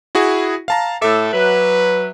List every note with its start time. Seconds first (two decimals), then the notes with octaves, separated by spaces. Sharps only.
0.15 E4 F#4 G#4
0.68 F5 A5 A#5
1.02 A2 A4 E5 D6
1.33 F#3 B4